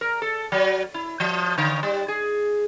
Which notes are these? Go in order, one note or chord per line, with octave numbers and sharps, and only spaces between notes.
A#4
A4
F#3
E4
F3
D3
G3
G#4